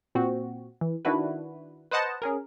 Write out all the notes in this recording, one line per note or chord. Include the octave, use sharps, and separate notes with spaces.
A#2 C4 F#4
E3
D#3 D4 E4 F#4 B4
B4 C5 D#5 F#5 A5
C#4 G#4 A#4